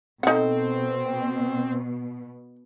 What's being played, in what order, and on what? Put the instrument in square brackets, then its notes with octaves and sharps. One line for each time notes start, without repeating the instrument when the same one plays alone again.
[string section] B2 [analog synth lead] C4 [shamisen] D#4 F#5 [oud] A4